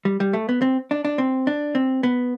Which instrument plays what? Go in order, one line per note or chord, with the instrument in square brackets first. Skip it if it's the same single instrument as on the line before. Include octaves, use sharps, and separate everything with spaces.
[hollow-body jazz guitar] G3
G3
A3
B3
C4
D4
D4
C4
D4
C4
B3